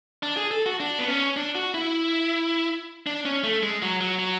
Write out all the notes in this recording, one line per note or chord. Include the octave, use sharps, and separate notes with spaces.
D4
G#4
A4
F#4
D4
B3
C#4
D4
F#4
E4
D4
C#4
A3
G#3
F#3
F#3
F#3